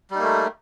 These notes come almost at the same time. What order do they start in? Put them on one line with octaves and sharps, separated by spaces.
G3 D#4 A#3 A3